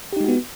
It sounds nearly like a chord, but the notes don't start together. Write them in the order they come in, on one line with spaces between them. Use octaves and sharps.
G4 D#4 G#3 F#4 B3